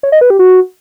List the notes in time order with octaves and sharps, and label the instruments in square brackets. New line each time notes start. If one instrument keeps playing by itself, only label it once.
[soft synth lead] C#5
D#5
B4
G4
F#4